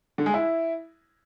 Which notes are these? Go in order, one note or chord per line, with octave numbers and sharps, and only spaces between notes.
D3
G#3
E4